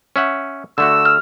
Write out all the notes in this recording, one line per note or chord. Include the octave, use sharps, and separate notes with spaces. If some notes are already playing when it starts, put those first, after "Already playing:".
C#4 E5 F#5
D3 A3 F#4 E6
F6